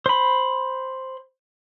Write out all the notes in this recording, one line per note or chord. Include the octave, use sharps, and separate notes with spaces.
C5 B5